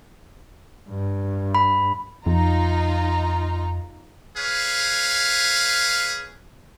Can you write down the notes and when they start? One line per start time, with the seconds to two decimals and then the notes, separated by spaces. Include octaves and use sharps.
0.89 G2
1.55 B5
2.26 F2 D#4 F4 A#5
4.37 G#4 B4 C#5 F5